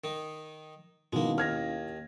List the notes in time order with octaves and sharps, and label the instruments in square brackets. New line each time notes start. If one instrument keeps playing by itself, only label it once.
[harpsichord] D#3 D#4
[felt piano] B2 D#3 [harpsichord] G#3 A#3 [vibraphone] C#4 E4 F5
[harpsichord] D#2 [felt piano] F6 G#6 A#6